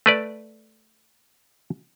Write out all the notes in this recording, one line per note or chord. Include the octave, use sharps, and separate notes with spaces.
A3 B4 D5